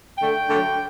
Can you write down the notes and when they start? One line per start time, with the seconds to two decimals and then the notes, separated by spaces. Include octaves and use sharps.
0.18 D3 A3 G5
0.49 D3 F#3 A3